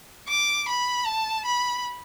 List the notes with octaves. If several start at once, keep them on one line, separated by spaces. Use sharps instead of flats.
D6
B5
A5
B5